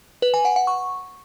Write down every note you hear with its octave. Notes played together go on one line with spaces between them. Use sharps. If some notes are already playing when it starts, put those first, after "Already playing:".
B4
G#5
F#5
F#5
C#6